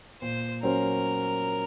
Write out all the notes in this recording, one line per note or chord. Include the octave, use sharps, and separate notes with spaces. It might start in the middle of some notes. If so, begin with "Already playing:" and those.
A#2 C5
F#3 C#4 F#4 A#4 C5